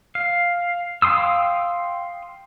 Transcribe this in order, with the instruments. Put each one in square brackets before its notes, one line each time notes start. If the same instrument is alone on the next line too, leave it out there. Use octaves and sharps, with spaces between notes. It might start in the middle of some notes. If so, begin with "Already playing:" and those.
[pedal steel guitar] F5
F5 G5 C6 D#6 E6